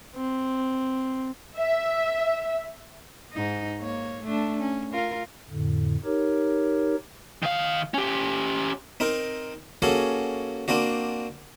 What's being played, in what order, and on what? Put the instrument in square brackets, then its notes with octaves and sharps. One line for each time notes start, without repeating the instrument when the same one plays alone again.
[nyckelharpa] C4
[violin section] E5
[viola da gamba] G#2 D#4
A#3 C#5
A3 D4
C#4
F4 A#4
[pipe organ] F2 A2 D3
D#4 G4 A#4 C#5
[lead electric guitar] D#3 F5
C#4 G4
[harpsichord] C4 D#4 A#4
A#3 C#4 F#4 G#4 A4
A#3 C4 D4 F#4